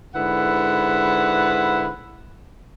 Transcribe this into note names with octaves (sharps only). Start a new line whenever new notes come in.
G#2 D3 E4 B4 F#5